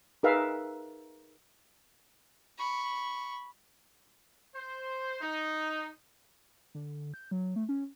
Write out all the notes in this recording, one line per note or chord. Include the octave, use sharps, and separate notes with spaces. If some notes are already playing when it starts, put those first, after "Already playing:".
D#4 G#4 A#4 B4 E5 F5
B5 C#6
C5
D#4
D3
G6
F#3
A3
C#4